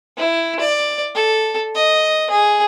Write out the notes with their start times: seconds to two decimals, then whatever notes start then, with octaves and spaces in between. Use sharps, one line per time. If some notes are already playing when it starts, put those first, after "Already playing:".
0.17 E4
0.60 D5
1.15 A4
1.75 D#5
2.30 G#4